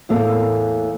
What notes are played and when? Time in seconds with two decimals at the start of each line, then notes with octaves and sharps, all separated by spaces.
0.09 E2 A2 E3 A#3 A4 F5